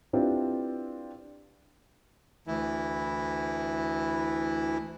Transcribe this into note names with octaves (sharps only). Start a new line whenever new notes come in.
C4 D4 E4 F4 G4 B4
D2 E3 E4